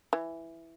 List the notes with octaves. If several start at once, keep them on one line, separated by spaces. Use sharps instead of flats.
E3